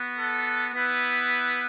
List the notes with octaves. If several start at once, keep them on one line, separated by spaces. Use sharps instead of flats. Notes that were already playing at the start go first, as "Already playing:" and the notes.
Already playing: B3 F#4
A4
B3 E4 B4